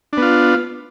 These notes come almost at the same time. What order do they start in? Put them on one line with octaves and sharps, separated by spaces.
D4 B3 F4